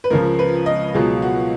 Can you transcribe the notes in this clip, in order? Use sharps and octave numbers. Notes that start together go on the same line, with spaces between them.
B4
C#2 C#3 F3 A#4
B4
D#5
C#2 B2 F#3 G#4
F#4